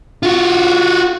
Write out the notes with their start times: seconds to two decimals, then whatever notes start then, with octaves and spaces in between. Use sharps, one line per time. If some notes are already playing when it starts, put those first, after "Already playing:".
0.23 F4 F#4